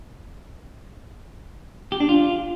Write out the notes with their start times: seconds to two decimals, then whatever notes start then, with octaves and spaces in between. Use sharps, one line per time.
1.92 G4
2.00 D4
2.09 F4